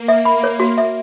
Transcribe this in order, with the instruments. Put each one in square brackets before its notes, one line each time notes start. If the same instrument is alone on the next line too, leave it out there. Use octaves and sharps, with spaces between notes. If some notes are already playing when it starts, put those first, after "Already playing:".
Already playing: [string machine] A#3
[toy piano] E5
B5
C#5
F#4
E5